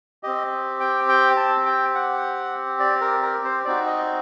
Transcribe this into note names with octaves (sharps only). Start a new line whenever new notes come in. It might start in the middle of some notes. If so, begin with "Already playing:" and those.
C4 G4 D#5
G5
G5
A5
G5
F#5
D5
A#4
A#4
C5
C4 D#4 F#4 D5
D#5